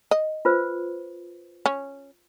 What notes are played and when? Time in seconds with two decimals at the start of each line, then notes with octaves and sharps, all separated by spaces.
0.11 D#5
0.45 F4 B4 C5
1.66 C#4